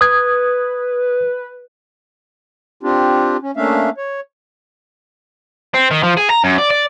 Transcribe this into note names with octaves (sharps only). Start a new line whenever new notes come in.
B4 D#6 G#6
C4 D4 F4 G4
C#4
A3 A#3 C#4 D4 E5 F5
C#5
C4
D#3
F3
G#4
A#5
F#2
D5
D5